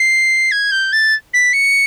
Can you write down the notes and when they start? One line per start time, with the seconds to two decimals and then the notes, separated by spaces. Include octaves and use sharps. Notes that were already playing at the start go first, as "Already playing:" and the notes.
Already playing: C7
0.51 G#6
0.71 G6
0.92 A6
1.33 B6
1.53 C#7